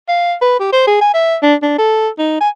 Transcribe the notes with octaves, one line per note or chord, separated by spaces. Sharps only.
F5
B4
G4
C5
G#4
G#5
E5
D4
D4
A4
D#4
G#5